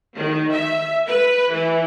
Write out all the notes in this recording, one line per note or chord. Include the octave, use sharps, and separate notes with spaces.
D#3
E5
B4
E3